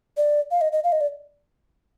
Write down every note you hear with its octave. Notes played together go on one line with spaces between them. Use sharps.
D5
F5
D#5
D#5
F5
D#5
D5